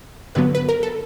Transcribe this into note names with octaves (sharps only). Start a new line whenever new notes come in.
G2 D3 F#3 B3 B4
B4
A#4
A4